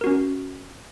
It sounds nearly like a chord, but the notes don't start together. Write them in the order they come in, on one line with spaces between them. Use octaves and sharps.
A#4 F#4 C#4